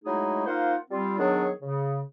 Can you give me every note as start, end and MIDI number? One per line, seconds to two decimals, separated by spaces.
0.05 0.45 54
0.05 0.45 56
0.05 0.45 57
0.05 0.45 63
0.05 0.45 64
0.05 0.45 68
0.46 0.76 58
0.46 0.76 63
0.46 0.76 65
0.46 0.76 72
0.46 0.76 77
0.46 0.76 78
0.91 1.18 55
0.91 1.18 60
0.91 1.18 65
1.18 1.50 51
1.18 1.50 54
1.18 1.50 59
1.18 1.50 62
1.18 1.50 68
1.18 1.50 73
1.62 2.01 49